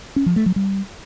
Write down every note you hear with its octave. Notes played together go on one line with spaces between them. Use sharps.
C#4
F3
A3
F#3
G3